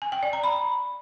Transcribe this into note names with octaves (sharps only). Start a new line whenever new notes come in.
G#5
G5
D5
A#5
B5